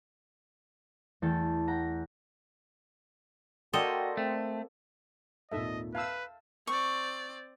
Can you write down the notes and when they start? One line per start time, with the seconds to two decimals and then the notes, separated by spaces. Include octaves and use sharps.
1.22 E2 A3 A4 G5 A6
1.68 F#5 G5 A#5 B6
3.73 A#3 F#4 A4 D5 D#5 G5 C6
4.17 A3 C4
5.52 G#1 D#2 A#2 A4 D#5 E5
5.95 B4 E5 F5 A5 E6 G6
6.67 C4 D5 C#6